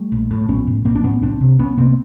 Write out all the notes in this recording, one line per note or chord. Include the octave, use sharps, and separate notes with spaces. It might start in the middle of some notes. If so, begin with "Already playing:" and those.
Already playing: G3 A3
A#1
A2
A#1 B3 C#4
A2
A#1 A#3 C4
D4
A2 B3 C#4
C2 C4 D4
C3
C2 B3 C#4
C3 A#3 C4